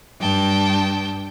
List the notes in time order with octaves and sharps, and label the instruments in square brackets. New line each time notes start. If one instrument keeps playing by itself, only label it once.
[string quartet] G2 G5 A5